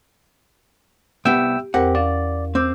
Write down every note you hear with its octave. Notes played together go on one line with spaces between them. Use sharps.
C2 B3 G4 E5 G5 E6
E2 C4 G4 A#4 F#5
C#4 D5 F5 A6
C4 D6 E6 G6